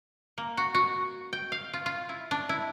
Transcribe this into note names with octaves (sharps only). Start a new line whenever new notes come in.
A#3
F#4
F#4
G5
F5
F4
F4
E4
D4
E4